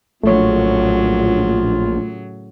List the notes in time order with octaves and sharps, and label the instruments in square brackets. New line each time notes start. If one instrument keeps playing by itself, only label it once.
[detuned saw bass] A#1 [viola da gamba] A2 C#3 F#3 [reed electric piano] A3 C#5 [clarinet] F4